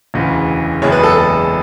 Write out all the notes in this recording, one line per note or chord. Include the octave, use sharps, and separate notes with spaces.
E1 D2 C#3 E3
F#1 E2 B2 G#3 B3 C#5
B4
A4
A4